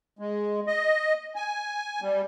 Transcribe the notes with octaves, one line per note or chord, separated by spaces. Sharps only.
G#3
D#5
G#5
G3